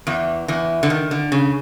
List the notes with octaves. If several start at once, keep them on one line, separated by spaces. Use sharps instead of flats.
E2 E3
E2 E3
D3
D#3
D3
C#3